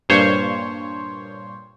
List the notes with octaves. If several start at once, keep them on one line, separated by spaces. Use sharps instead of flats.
G2 A#2 C5 C#5